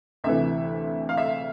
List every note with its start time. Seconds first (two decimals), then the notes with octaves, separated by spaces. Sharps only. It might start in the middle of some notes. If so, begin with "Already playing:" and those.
0.24 D2 C3 E3 E5
1.09 F5
1.17 E5